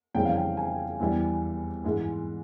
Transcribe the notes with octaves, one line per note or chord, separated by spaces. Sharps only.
F2 C#3 E3 G3 G5
F5
G5
G#5
E2 E3 G3
G#2 E3 G#3